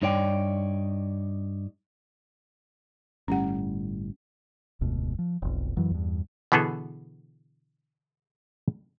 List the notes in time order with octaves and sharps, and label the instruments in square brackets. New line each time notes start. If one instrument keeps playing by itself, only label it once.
[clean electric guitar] G2 D#4 C#5 D5 G5
[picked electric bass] G1 A2 G3 [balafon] C#4 F#5
[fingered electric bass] F1 D2 G#2 B2
F3
F1 B1
F#2 E3 F#3
E2 G2
[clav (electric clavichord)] B2 D3 E3 B3 G#4 A4